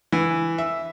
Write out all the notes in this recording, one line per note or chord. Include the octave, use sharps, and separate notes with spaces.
E3
E5